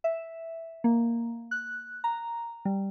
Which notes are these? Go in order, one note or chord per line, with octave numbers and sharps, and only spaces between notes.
E5
A#3
F#6
A#5
G3